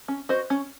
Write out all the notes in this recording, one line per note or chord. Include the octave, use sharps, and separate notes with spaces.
C#4
F#4 C5 D#5
C#4